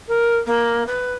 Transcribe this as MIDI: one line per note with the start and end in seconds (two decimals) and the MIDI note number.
0.08 0.36 70
0.46 0.83 58
0.86 1.13 71